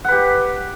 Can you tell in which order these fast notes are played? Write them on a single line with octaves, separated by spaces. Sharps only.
F#5 B4 G4